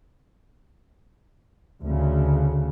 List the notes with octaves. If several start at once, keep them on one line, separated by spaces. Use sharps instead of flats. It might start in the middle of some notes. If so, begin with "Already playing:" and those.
D2 C#3